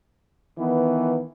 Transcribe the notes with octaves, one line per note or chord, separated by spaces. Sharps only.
D#3 E3 B3